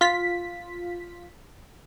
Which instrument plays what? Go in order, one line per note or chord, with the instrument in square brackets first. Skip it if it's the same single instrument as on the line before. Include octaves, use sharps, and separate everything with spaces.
[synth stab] F4 B6